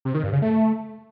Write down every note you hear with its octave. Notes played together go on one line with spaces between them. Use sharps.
C3
D#3
G2
C#3
A3